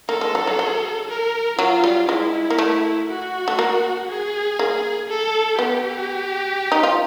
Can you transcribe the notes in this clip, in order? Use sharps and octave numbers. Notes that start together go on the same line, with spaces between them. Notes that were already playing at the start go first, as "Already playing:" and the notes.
A#3 A4
G#3
F#3
F#3
F#3
A#4
F#3 F4
G3
G#3 E4
A#3
A3
F#4
A3
A#3
G#4
A#3
A4
B3 G4
D#4
F4